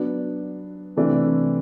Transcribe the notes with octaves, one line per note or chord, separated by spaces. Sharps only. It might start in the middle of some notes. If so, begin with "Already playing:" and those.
Already playing: F#3 B3 D4
C3 E3 A3 D4